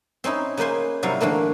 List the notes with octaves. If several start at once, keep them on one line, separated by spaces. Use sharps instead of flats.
C4 C#4 D#4 E4
C#3 A#3 B4 C5 G#5
G#2 C3 F#3 G3 E4 F5
D3 E3 A3 A#3